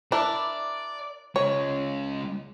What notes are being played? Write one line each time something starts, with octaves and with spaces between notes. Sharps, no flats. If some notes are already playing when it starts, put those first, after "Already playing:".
D4 E4 A#4 D5
C#2 G#3 C#5